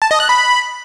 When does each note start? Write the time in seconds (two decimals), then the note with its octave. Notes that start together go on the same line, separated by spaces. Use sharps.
0.02 A5
0.11 D#5
0.20 F#6
0.29 B5